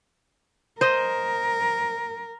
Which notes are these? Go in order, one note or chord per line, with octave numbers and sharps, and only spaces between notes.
A#4 C5 D#5